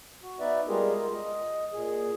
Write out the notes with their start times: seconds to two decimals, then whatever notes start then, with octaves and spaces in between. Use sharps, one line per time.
0.23 F#4
0.40 B3 D#4 B4 D5 E5
0.68 G3 G#3 F4 G4 G#4 A#4
0.98 G#3 F4 A#4
1.13 D#5
1.73 A#2 G#4